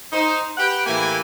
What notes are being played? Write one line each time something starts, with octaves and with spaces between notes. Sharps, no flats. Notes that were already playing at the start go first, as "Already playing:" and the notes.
D#4 C5
G4 B4 F#5 G5
A2 E3 A#3 E4 G4 G#5